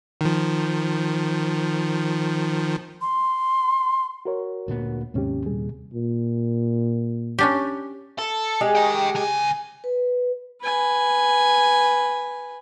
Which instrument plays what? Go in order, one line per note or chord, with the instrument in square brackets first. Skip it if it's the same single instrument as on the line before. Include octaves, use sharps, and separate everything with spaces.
[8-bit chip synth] D#3 F3
[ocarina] C6
[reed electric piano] F#4 A#4 C#5
[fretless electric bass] D2 A#2 B3
[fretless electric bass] D#2 C3 [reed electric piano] G#2 C#4 G4
[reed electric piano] A#2 G3 G#4
[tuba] A#2
[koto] C#4 D4 G4
[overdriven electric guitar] A4
[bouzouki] G#3 G4 G#4
[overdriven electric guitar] D#5 G5
C#2 G#5
[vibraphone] B4
[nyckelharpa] B4 G#5